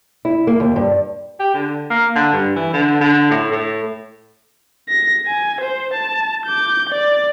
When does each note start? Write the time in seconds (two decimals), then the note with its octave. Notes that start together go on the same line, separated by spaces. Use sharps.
0.25 E4
0.47 A#3
0.60 D#2
0.76 G2
1.39 G4
1.54 D3
1.90 A#3
2.15 D3
2.33 G2
2.56 E3
2.73 D3
3.00 D3
3.30 A2
3.51 A2
4.89 A#6
5.26 G#5
5.61 C5
5.94 A5
6.46 D6 G6
6.89 D5